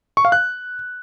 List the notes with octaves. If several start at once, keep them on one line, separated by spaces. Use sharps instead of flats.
C#6
F5
F#6